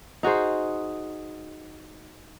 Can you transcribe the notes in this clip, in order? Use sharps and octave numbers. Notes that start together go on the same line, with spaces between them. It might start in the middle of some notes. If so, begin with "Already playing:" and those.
D#4 F#4 G#4 C5